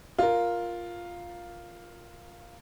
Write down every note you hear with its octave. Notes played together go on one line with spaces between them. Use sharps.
F4 A#4